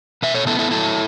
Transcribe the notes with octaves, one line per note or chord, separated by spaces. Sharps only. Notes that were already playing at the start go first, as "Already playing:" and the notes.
B2 B4 E5
A4 C#5
B3 E4 A4
E4 A4
F#3 E4 A4